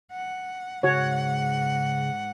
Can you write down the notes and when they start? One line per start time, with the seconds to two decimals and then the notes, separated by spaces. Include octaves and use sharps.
0.12 F#5
0.83 G#2 C#3 F#4 C#5 F#5